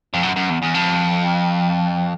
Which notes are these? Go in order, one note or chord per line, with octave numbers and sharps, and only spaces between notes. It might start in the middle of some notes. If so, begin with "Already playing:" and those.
F2
F#2
F#2
E2
E2
F2